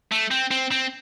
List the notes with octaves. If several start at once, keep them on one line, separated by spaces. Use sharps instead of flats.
A3
C4
C4
C4